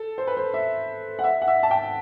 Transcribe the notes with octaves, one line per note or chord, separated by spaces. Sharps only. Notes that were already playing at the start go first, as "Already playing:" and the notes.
Already playing: A4
C5
B4
C5
E5
F#5
E5
F#5
E5
A5
G5